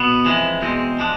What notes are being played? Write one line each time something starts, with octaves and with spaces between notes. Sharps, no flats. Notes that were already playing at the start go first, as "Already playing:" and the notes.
Already playing: B2 B3
F2 E3 G#3
E2 B2 G#3 C4
F3 G#3 D4